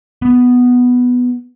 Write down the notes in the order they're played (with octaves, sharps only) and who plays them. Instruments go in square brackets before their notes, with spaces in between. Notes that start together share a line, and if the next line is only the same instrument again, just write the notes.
[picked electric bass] B3